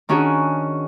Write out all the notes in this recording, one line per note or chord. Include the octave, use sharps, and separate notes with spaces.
D#3 C#4 D4 F#4 G#4